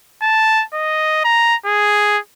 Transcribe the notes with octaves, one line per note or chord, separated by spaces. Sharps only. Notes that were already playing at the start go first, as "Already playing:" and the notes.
A5
D#5
A#5
G#4